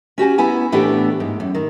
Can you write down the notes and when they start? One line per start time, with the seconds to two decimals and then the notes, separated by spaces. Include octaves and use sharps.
0.18 C#4 F#4 G4 G#5
0.38 B3 E4 G#5 A#5
0.72 A2 E3 A3 B3 D4 G4
1.20 G#2
1.40 F#2
1.55 D#3